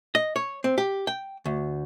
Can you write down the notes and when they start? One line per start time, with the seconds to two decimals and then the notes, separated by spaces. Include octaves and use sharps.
0.15 D#5
0.36 C#5
0.64 C4
0.78 G4
1.07 G5
1.46 D2